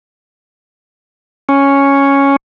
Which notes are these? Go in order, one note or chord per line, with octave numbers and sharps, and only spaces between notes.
C#4